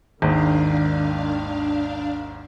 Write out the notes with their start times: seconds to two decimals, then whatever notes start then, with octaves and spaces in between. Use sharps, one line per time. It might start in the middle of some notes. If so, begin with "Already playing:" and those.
0.22 G#1 D#2 G#2 D#3 D4 F5